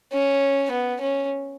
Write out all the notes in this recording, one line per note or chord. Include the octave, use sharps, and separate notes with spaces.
C#4
B3
C#4